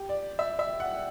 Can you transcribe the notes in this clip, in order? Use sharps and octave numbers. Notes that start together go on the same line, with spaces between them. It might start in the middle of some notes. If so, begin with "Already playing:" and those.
Already playing: G4
D5
E5
E5
F#5